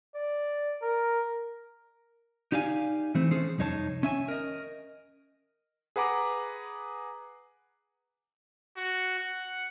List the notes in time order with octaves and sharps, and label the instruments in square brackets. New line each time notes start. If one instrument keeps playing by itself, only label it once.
[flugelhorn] D5
A#4
[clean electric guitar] D#4 G4 D5 F5 G#5
E3 A3 C4
C#4 G#4 A4 C5
C2 F2 D#4 C#5 A5
C#4 E5 G#5
A#4 D#5
[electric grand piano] G#4 B4 F#5 A#5 D6
[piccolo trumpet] F#4
F#5